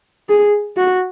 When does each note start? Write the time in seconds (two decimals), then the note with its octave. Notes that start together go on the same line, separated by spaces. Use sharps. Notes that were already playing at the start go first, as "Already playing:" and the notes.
0.29 G#4
0.77 F#4